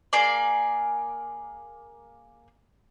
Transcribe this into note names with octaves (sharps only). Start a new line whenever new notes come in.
A#3 G#4 D5